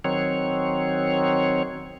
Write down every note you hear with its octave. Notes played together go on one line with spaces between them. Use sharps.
D#3 F#3 C4 C#5